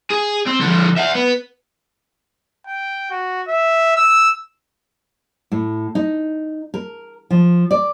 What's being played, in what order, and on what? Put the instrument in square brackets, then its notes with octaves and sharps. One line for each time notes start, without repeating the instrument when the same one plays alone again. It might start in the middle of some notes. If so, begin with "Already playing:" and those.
[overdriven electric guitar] G#4
C4
D3 F3
E5 F#5
B3
[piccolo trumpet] G5
F#4
E5
E6
[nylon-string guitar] A2
D#4
A#4
F3
D5